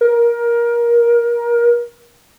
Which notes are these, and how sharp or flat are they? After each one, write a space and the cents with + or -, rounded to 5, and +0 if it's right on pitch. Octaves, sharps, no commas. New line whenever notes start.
A#4 +20